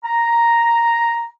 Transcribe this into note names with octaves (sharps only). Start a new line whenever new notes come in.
A#5